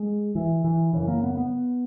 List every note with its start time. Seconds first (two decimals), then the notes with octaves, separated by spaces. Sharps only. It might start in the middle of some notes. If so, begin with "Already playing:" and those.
Already playing: G#3
0.35 E3
0.64 E3
0.93 F#2 C#3 E3
1.08 A#3
1.23 B3
1.37 B3